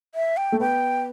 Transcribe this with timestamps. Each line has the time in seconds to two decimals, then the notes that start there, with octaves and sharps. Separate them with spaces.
0.15 E5
0.37 G5
0.52 A3
0.60 B3 G5